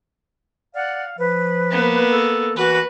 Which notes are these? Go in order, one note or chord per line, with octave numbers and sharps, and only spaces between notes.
D5 F5 F#5
F3 B4
A#3 B3
A4
E3 F#4 B4